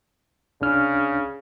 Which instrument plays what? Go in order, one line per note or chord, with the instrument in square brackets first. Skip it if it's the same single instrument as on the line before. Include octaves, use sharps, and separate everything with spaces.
[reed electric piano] C2 D4 F6 [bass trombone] C#3